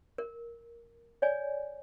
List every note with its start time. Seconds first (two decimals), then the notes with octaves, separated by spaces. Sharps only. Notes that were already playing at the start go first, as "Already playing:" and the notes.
0.18 A#4
1.22 C#5 D5 G#5